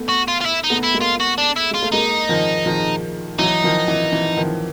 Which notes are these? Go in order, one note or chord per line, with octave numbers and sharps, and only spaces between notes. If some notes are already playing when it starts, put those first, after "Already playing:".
Already playing: A3 B3
F#4
F4
F4
E4
D#4
A3 B3
E4
G#3 A#3
F4
F#4
D4
E4
G#3 F4
A3
G#3 A#3 D#4
D#3 F3
D#3 F3
E3 F#3 D#4
D#3 F3
E3
E3
D#3 F3